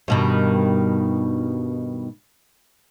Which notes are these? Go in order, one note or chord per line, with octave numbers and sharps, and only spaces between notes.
G2 B2 D#3